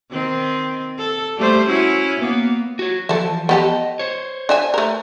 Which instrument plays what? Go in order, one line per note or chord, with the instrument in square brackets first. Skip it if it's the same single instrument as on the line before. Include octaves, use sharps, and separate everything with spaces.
[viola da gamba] D#3 C4
A4
G3 A3 C5
C#4 E4 F#4
A#3 B3
[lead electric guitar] F#4 C#5
[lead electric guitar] E3 F3 [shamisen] A4 E5
[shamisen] B3 G4 A4 [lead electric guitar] D#5
[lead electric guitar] C5 C#5
[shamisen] D4 E5 G#5
A3 A#4